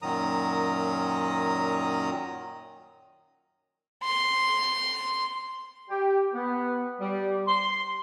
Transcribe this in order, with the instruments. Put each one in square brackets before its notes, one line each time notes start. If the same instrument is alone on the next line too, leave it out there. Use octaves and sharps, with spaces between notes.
[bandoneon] F#2 A#2 D#3 F#3 A#5 D#6
[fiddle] C6
[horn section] G4
B3
G3
C6